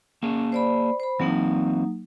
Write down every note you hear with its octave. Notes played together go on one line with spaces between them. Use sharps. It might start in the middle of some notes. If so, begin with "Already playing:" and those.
A#3 C#4 G#4
C5 D5 B5
C5 B5
E3 F#3 A#3 C4 D#4